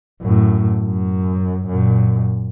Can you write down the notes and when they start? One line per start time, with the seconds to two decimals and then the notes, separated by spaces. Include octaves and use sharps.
0.22 F#2 A2
0.83 F#2
1.68 F#2 A#2